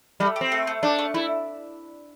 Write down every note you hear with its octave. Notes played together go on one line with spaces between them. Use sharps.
G3 A3
G4
C4
A3
A3
A3 D4
A3
A3 E4